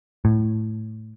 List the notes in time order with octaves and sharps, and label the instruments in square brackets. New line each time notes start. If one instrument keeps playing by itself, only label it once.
[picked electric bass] A2